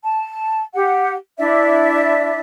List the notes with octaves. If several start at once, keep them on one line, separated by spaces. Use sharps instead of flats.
A5
G4 F#5
D4 E4 D5 E5